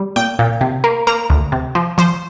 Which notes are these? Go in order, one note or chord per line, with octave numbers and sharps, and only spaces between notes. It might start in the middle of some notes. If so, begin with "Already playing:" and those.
Already playing: G3
A#2 G5
A#2
C3
A#3
A#3 A#5
D2
C3
F3
F3 C5